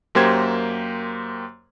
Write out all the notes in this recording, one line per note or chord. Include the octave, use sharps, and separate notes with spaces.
F#2 A#3 G4 C5 G#6